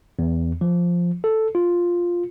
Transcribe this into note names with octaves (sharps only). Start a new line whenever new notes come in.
E2
F3
A4
F4